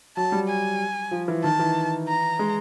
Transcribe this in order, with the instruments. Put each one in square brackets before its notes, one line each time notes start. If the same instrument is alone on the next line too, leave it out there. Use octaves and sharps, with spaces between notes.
[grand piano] F#3 [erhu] A5
[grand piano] G3
[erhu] G#5
[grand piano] F3
E3
[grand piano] D#3 [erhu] A5
[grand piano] E3
[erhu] A#5
[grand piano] G#3